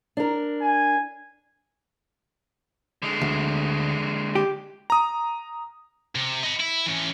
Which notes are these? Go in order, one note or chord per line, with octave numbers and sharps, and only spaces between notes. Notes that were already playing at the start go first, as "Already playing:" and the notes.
D4 A#4
G#5
D3 G#3
D2
G4
A#5 D#6
C3
D#5 B5
E4
E3 C#4